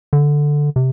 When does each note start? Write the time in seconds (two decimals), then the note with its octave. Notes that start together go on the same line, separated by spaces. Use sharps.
0.13 D3
0.76 C3